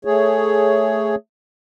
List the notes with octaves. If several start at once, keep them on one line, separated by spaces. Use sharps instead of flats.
A3 G#4 C#5